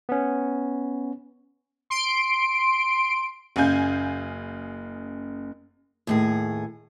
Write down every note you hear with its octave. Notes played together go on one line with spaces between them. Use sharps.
B3 C#4
C6 D7
F#1 C#3 F5 G#5 G6
D#2 A2 G#4